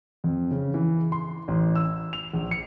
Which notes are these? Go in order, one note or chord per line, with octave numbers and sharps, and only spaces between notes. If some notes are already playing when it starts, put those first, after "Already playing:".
F2
C#3
E3
C6
A1
E6
F7
A#1
C#7